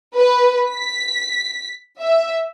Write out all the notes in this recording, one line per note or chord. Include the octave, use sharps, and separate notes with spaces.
B4
B6
E5